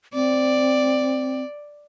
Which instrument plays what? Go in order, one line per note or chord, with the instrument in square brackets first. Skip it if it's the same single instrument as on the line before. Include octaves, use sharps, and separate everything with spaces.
[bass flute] C4 [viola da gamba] D5